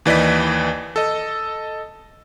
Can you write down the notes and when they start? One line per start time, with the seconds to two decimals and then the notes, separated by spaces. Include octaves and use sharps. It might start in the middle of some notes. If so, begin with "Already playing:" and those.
0.06 D#2 E3 D5 D#5 B6
0.96 A4 D#5